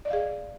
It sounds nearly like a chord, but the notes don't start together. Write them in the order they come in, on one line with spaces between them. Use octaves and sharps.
D5 D#5 F5 G#4